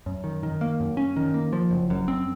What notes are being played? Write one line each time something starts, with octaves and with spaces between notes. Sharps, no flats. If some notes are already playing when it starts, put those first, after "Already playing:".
F#2
D#3
D#3
A#3
F#2
C#4
D#3
A#3
F3
F#1
F#2
C4